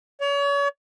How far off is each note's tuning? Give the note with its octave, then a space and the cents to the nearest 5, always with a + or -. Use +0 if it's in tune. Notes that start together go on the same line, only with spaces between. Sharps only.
C#5 +35